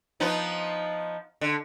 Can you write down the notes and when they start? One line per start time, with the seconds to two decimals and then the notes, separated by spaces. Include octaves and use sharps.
0.20 F3 B3 D#4
1.41 D3